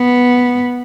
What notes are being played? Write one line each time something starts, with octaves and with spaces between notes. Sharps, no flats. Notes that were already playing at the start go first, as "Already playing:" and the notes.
Already playing: B3